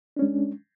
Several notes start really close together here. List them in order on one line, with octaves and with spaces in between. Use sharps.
D4 C#4 G#3